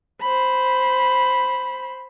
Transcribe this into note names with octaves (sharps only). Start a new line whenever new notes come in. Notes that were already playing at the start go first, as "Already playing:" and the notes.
C5 B5